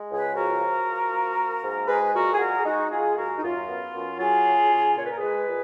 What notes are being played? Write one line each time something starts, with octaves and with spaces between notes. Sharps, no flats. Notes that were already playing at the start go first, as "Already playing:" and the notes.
Already playing: G#3
C#2
G#4 B4
F3 F#4 A#4
F3
F3
A#3
A#3
G#2
G#3 G#4 B4
B4
A#2 F#4 A#4
G#4
G#3 F#4 A#4
G#4
G#3 D#4 F#4
G#3 F4 G#4
D#2 F#4 A#4
D#4
F#2 F4
B3
F#2
F#3 F4 G#4
C#3
C#3
A#2 C#5
B4
A#4
G#3 G#4 B4
A#2